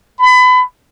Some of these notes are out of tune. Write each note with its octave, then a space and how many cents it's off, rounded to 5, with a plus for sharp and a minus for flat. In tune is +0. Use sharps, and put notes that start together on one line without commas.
B5 +30